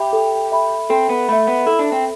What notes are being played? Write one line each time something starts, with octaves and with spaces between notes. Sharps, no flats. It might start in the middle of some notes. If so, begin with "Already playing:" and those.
Already playing: G4 E5 B5
A4
E5 B5
C4 A4
B3
A3 E5 B5
B3
E4 A4
D4
C4